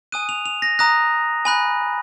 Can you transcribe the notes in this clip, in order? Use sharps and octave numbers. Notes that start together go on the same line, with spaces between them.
G#5 D#6 F#6 D#7
F7
F7
A#6
A#5 D#6 F#6 A#6
G#5 B5 F#6